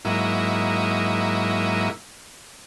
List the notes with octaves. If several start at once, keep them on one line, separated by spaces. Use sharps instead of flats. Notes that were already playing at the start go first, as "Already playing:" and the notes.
G#2 F#3 A#3 D#4 E4